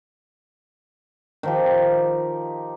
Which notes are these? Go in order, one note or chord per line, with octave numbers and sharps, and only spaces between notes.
D#3 F3 G4